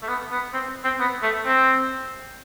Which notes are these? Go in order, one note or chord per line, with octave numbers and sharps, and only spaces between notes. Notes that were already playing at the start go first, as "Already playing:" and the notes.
A3
B3
B3
C4
C4
B3
A3
C4